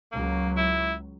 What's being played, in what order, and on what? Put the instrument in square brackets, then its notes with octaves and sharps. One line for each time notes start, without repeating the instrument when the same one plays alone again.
[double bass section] C#2 F#3 [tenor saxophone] A#3
[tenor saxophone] E4